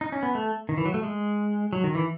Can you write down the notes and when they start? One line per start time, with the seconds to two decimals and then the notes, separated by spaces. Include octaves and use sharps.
0.01 D#4
0.12 C#4
0.23 B3
0.35 A3
0.69 D#3
0.78 E3
0.85 F#3
0.94 A3
1.03 G#3
1.73 F#3
1.84 D#3
1.95 E3